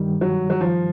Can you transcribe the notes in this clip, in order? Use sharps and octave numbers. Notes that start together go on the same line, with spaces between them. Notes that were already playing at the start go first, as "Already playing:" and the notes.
Already playing: G2 D#3 G3
F#3
F#3
F3